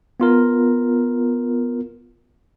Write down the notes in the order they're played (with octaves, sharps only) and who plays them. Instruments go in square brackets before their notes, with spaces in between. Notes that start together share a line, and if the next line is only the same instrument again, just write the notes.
[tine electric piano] B3 F4 A#4